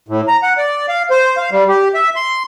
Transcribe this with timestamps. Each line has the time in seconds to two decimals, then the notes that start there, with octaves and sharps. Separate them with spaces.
0.08 A2
0.28 A#5
0.43 F#5
0.58 D5
0.88 F5
1.11 C5
1.37 F5
1.51 G3
1.69 G4
1.94 E5
2.16 C6